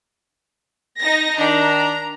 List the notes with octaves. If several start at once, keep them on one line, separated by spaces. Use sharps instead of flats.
D#4 A#6
D#3 D4 A#5